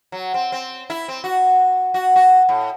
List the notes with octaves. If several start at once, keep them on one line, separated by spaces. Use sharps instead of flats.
F#3
C4
C4
E4
C4
F#4
F#4
F#4
A2